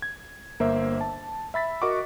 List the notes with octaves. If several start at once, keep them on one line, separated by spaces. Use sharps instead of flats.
G#6
G1 A#3 C5 E5
A5
E5 B5 A6 B6
F#4 A#4 D#5 F#5 C#6 D6